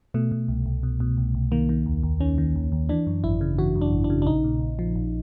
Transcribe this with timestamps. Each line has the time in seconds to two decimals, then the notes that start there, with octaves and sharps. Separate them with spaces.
0.14 B2 A3
0.32 B2
0.49 C2
0.66 C2
0.83 B2
1.00 B2
1.17 C2
1.35 C2
1.52 D#3 A#3
1.69 D#3
1.86 D#2
2.03 D#2
2.20 D#3 C#4
2.38 D#3
2.56 D#2
2.72 D#2
2.89 E3 D4
3.07 F#2
3.24 G#1 E4
3.41 C#3
3.58 E3 F#4
3.76 F#2
3.81 D4
3.93 G#1
4.04 D4
4.10 C#3
4.22 D4
4.27 A#1 D#4
4.44 A#2
4.61 A#1
4.79 F3
4.96 A#1